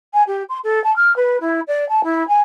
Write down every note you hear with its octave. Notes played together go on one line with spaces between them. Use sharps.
G#5
G4
C6
A4
A5
F6
B4
E4
D5
A5
E4
G#5